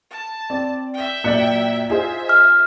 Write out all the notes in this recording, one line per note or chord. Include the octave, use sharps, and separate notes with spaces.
A5
C4 D5
E5 G5
F#2 A#2 D5 F#6 C#7 F#7
D#4 F4 G#4 C5 E5
F6